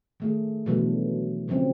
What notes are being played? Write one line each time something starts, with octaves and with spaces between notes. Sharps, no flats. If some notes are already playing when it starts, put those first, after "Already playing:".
D#3 A3 G#4
B2 D3 E3 F#3 G3 A3
C#3 F3 G3 C4 C#4